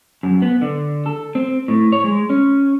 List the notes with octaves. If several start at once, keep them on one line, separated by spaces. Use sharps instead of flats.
F#2
B3
D3
A4
C4
A2
C#5
G#3
C#4